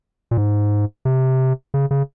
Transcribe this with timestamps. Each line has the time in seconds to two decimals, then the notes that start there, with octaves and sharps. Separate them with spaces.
0.31 A#2
0.37 G#2
1.05 C3
1.74 C#3
1.91 C#3